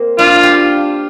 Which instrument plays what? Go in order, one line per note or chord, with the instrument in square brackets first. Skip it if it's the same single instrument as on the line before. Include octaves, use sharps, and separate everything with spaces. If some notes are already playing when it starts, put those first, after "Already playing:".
Already playing: [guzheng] A#3 C4
[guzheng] D4 [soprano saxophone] F4
[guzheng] G4